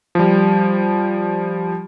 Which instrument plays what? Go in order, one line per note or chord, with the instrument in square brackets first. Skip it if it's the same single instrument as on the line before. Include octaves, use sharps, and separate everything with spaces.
[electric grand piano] F3 G3